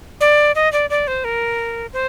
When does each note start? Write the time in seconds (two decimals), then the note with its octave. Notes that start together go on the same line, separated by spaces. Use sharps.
0.21 D5
0.55 D#5
0.72 D5
0.90 D5
1.07 C5
1.24 A#4
1.93 C5